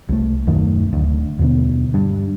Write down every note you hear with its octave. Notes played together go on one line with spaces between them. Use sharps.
C2 A3
D#1 F#2 D#3 A3
D1 D2
D#2 B2 D3 B3
G2